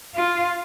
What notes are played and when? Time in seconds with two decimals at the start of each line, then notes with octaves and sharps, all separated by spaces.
0.15 F4